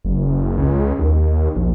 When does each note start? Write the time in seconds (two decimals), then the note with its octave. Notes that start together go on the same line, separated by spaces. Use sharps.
0.04 F#1
0.58 C#2
0.99 D#2
1.56 A#1